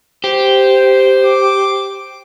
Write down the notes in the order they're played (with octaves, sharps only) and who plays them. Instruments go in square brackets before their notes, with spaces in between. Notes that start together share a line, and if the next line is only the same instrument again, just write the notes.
[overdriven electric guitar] G4 [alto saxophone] C5
[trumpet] D6